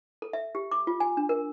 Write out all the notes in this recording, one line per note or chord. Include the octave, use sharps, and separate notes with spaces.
A4
E5
G4
D6
F4
G#5
D4
A#4